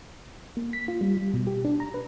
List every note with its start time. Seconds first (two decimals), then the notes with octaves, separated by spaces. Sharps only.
0.57 A#3
0.73 B6
0.88 F4
1.01 G3
1.17 G3
1.34 B2
1.47 G4
1.65 D4
1.80 A#5
1.94 B4